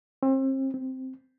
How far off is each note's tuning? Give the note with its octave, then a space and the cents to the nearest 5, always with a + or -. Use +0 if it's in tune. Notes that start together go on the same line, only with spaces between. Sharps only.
C4 +35
C4 -5